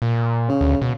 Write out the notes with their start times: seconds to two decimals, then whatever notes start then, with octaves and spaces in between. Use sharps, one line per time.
0.02 A#2
0.49 C#3
0.61 D2
0.82 B2